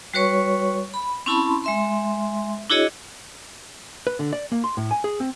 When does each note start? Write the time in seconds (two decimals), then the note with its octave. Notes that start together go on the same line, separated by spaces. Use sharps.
0.14 G3 F#4 B4 C#5 C#6
0.94 B5
1.26 C4 C#4 E4 A5 B5 C6
1.64 G#3 E5 C6
2.70 D4 E4 F#4 G#4 C#5 D#5
4.07 B4
4.19 D3
4.33 D5
4.52 A#3
4.64 C6
4.77 A2
4.91 G#5
5.04 G#4
5.20 C4